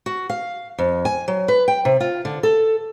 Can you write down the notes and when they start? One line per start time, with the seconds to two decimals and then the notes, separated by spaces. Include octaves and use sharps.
0.06 F#4
0.30 F5
0.78 F2
1.05 G#5
1.28 F#3
1.48 B4
1.68 G5
1.85 C3
2.00 F4
2.25 D3
2.43 A4